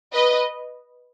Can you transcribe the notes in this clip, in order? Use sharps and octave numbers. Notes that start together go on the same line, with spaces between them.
B4 D#5